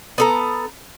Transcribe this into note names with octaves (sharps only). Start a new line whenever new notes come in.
B3 A4 A#5